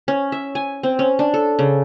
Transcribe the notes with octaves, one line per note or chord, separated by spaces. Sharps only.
C#4
E5
G#5
C4
C#4
D4
A4
C#3